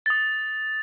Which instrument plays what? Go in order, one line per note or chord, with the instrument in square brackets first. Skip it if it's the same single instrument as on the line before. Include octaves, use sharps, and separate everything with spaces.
[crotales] D#6 A6